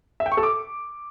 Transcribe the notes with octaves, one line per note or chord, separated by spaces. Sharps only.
E5
G5
C#6
A4
D6